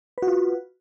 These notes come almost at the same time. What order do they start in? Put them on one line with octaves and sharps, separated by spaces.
B4 F#4 F4